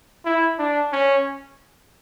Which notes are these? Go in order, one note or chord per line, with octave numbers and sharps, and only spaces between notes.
E4
D4
C#4